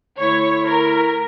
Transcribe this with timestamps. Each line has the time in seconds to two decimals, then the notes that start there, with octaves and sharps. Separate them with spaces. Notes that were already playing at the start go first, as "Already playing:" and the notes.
0.18 D3 A3 E4 C#5
0.67 A#4